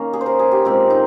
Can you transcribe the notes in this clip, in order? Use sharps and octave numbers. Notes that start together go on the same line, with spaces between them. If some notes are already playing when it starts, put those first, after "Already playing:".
Already playing: D#3 A#3 C#4
G#4
C5
A#4
G#4
G4
A#2 G#3 C4
D#4